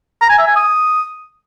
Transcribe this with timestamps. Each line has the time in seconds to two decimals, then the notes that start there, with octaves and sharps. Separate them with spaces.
0.21 A#5
0.30 G#5
0.38 E5
0.47 G#5
0.56 D#6